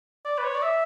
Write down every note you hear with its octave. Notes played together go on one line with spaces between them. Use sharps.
D5
B4
C#5
D5
E5